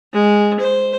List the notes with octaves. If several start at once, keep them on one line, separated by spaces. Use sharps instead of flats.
G#3
C5